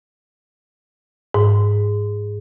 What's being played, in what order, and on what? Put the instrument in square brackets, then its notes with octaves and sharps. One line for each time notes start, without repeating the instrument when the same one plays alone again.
[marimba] G#2